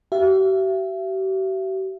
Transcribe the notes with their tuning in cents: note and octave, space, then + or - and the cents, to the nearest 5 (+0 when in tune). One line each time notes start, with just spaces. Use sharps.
G4 -45 E5 +35